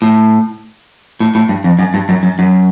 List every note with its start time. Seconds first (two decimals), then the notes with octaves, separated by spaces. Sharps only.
0.02 A2
1.20 A2
1.35 A2
1.49 G2
1.64 F2
1.79 F#2
1.94 G2
2.09 F#2
2.23 F#2
2.39 F#2